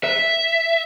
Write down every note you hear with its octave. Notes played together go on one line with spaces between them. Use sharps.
E5